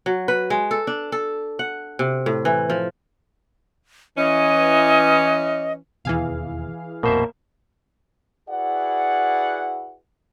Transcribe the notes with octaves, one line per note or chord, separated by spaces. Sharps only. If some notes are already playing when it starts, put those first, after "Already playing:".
F#3
B4
G#3
A4
D4
A4
F#5
C3
A2
E3
F3
E3 C#4 D#5
E1 D#2 B2 E3 G#4 F5
F1 A#1 B2 A#3 C5 E5
E4 F#4 G#4 B4 D5 F#5